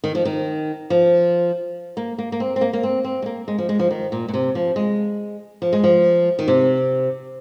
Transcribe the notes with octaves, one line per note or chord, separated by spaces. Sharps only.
D#3
F3
D#3
F3
A#3
A#3
A#3
C4
C4
A#3
A#3
C4
C4
G#3
A#3
G#3
F3
G#3
F3
D#3
A#2
A#2
C3
F3
G#3
F3
G#3
F3
D#3
C3